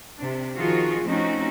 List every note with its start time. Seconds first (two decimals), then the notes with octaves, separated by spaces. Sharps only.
0.18 C3 D4
0.55 D#3 F3 F4 F#4 G#4
1.04 F3 A3 C4 C#4 D#4 F#4